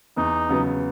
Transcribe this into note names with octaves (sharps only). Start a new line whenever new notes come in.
E2 D#4
C#3 F#3 B3